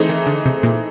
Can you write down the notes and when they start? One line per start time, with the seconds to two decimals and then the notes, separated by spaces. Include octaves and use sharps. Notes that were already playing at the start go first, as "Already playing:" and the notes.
Already playing: E3 A3 C4 D#4 G#4
0.09 D#3
0.27 D3
0.46 C3
0.63 A#2